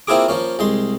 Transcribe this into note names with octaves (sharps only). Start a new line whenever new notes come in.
A#3 C4 E4 F4 G#4 D6
F3 A#3 C#4
C2 G#3 C6